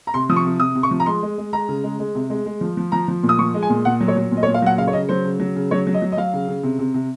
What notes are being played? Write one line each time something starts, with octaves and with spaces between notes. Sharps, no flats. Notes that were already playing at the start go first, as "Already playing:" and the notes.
A#5
C3 C6
F3 D#6
C#6
C3
C3 D#6
C3
C#6
F3
A#5
G#3 C6
G#3
G#3
G#3 A#5
C#3
G#3
G#3
C3
G#3
G#3
F3
F3
F3 A#5
F3
A#2
D#6
F3 C#6
G#3
G#5
A#2
A#2 F#5
F#3
C#5
F#3
A#2
D#5
C#5
A#2
F5
F#3 F#5
C#3 F5
C#5
C#3 D#5
F#3 C5
C#3
F#3
C#3
F#3 C#5
F#3
D#5
F#3
D#5
F#3 F5
C#3
C#3
C3
C3
C3